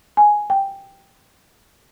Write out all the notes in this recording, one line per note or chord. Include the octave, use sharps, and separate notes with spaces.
G#5
G5